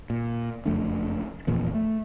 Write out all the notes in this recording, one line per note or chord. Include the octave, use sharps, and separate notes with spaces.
A#2
F#1 F2 A3 D4
D1 E2 A#2 F3
A3